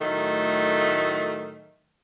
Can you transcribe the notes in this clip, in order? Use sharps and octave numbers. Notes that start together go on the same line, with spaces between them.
A2 D#3 F#3 A3